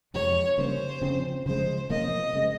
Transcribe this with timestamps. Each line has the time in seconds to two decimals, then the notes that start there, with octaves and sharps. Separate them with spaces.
0.14 F2 C3 F3 G#3 C#5
0.58 C#3 G3 A#3 C#4 C5
1.02 C#3 F3 C4
1.46 C#3 F3 G#3 C5
1.90 C3 F3 A#3 C#4 D#5
2.33 C#3 G#3 C4